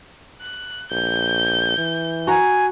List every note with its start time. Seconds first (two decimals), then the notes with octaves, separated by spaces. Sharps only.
0.41 F#6
0.92 A#1 G6
1.78 E3
2.27 F#4 G#5 A#5